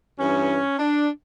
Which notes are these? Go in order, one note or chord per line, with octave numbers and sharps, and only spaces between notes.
G2 E3 C#4
D4